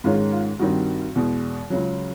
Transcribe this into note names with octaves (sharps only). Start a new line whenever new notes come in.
G#2 D#3 G#3 C#4 F4
F4
G2 D#3 G3 C4 F#4
E2 B2 G#3
C#2 C#3 F#3